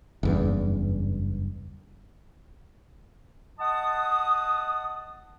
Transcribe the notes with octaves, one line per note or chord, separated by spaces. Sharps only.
F#1 E2 G2
D#5 F#5 A5 D#6